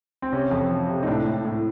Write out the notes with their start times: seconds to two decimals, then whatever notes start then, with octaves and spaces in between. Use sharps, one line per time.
0.22 C4
0.33 C3 C#4
0.51 F2
0.70 F3
0.89 C3
1.03 D#4
1.07 A2 D4
1.26 A2
1.45 A2